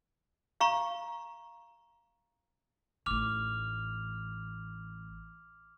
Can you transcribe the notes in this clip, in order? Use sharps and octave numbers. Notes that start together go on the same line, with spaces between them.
F5 A#5 C#6
A1 D#3 D6 F6 F7